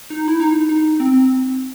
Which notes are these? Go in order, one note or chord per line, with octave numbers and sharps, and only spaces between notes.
D#4
E4
D#4
D#4
C4